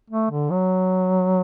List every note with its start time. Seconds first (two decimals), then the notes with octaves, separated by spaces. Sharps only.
0.10 A3
0.30 D3
0.50 F#3